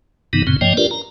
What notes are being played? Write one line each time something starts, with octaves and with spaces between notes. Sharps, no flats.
G2 C3 D#3 E3 B3 D#4
F#2 A#2 C#3 C4
G2 F3 A#3 C#5 D#5 G5
D4 F4 G4 A#4 B4 D5
A#5